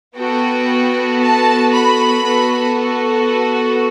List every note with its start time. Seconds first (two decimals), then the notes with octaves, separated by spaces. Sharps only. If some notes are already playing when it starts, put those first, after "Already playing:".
0.17 B3 F#4 A4 G5
1.20 A5
1.72 B5
2.24 B3 F#4 A4